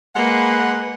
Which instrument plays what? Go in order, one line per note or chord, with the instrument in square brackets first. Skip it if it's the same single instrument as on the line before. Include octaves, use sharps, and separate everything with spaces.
[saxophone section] G#3 F#5 [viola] A#3 B4